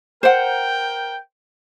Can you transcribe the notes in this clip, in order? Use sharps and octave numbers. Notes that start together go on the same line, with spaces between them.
A#4 C5 F#5 G5